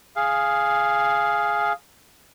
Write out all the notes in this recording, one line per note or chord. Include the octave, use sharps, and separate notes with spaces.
G#4 F5